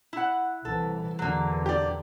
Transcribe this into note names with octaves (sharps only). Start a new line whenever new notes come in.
E4 F#5
C2 E3 A4
E2 D3 F#3 A#3
G4 D5